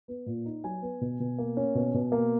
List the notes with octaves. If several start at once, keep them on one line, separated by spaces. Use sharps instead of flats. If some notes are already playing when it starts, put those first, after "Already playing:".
B3
A#2
D#4
F#3 G#5
B3
B2
B2
A#3
C#4
B2
B2
A#3